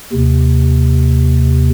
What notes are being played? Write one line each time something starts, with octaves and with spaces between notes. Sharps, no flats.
D#2 C3